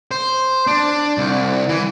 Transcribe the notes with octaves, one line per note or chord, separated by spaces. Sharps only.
C5
D4
C2
E3